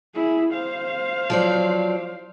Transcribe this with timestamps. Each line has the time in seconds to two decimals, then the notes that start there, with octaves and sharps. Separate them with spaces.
0.15 E4 G#4
0.53 C5 F5
1.30 F3 F#3 D5